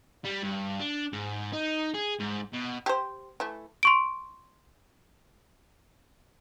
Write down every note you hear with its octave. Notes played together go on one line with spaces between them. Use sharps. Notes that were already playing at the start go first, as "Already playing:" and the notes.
G3
G2
D4
G#2
D#4
G#4
G#2
B2
G4 A4 C5
E3 A3
C6 C#6 D7